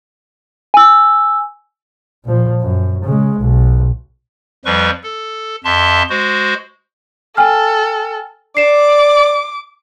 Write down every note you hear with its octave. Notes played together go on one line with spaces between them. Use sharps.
G#5 E6
A#2 F3
F#2
C#3 G#3
B1
F2 F3 G3 B4 C#6
A4
F2 E5 A5 C6
G#3 F#4 C5
A4 G5 G#5 F6
D5 D6 C7 E7